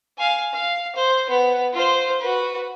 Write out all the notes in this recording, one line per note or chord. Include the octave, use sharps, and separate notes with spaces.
F5 G#5
F5
C5
B3
F4 C5
F#4 B4